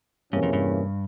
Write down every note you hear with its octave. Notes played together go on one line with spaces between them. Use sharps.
E2 G2 C3 E3 A#3 C#4
F2
G2